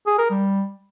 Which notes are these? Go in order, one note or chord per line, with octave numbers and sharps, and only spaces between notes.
G#4
A#4
G3